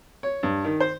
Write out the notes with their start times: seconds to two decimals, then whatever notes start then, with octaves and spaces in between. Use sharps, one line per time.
0.23 C#5
0.43 G2
0.64 D#3
0.80 C5